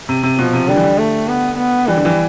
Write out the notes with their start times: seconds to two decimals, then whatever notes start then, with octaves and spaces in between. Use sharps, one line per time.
0.09 C3
0.23 C3
0.38 B2 F3
0.53 C3
0.68 D3 G3
0.76 E3
0.84 D3
0.98 A3
1.28 B3
1.58 B3
1.88 E3 G3
1.97 D3
2.05 E3